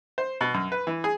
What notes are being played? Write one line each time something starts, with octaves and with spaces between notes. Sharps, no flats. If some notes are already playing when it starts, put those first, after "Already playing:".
C5
B2
F#2
B4
E3
G#4